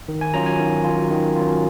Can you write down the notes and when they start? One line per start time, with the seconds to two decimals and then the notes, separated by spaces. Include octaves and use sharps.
0.08 D#3
0.21 G#5
0.34 F#3 C#4 F4 A#5
0.46 G#5
0.59 D#3
0.84 F#3 C#4 F4
1.10 D#3
1.36 F#3 C#4 F4